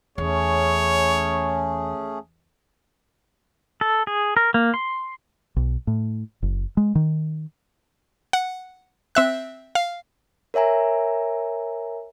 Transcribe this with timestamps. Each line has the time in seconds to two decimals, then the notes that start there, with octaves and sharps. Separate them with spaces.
0.18 E2 A3 C#4 G#4 C#5
3.81 A4
4.07 G#4
4.37 A#4
4.54 A#3
4.74 C6
5.56 B1
5.87 A2
6.42 F#1
6.77 G#3
6.95 D#3
8.33 F#5
9.15 C4 E5 F#6
9.75 F5
10.54 A#4 C#5 E5 G#5 A#5